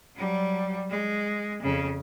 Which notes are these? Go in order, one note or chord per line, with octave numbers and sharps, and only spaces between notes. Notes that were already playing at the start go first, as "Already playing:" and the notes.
F#3 G3
G#3
F2 C#3